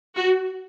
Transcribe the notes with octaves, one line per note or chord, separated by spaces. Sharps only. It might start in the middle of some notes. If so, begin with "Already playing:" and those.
F#4